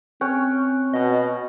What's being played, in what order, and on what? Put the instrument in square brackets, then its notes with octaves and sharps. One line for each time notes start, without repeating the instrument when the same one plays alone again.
[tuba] C4 [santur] C#4 C#5 G5 [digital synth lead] F#6
[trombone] B2 [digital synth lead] D#5